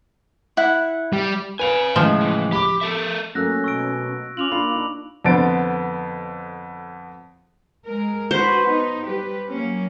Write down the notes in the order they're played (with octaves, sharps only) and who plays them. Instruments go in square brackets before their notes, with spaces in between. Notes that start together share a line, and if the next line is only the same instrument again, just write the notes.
[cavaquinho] E4 F#5
[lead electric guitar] G3
[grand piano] B4 F7 [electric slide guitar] F5 F#5 G#5
[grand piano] A2 C#3 G#3 [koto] F3
[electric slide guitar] E3
[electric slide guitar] G4 [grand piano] B5 D6
[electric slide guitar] A4 A#4 E5
[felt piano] F#3 A3 A#3 [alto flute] C#4 [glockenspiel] E6 F#6 A#6
[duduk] B2 [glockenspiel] C#6 E6 D7
[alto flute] C#4 [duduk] F4 [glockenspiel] D6 F7 F#7
[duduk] A#3 [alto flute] D4 [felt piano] F4 [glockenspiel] B5
[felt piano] D#4
[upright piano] F2 D3 B3 C5 A6 D7
[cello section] G#3 A#4
[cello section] D4 F#4 B4 [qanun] C5
[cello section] B3 D#4
G3 G4 B4
F#3 A#3 C#4